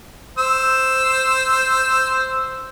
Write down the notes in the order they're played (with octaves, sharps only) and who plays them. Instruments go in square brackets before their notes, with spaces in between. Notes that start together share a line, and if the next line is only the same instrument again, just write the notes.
[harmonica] C5 E6